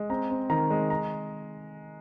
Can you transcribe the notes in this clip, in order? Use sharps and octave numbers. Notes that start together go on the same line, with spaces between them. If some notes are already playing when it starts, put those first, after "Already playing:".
Already playing: G#3
C4 A#5
C4
D#3 A#5
G#3
A#5